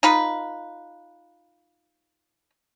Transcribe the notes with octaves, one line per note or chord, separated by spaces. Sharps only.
D#4 F4 B4